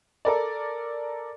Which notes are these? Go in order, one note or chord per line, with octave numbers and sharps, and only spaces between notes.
A4 A#4 D5